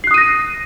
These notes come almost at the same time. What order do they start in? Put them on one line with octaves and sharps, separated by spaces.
C7 F#6 D#6 D#7 A#6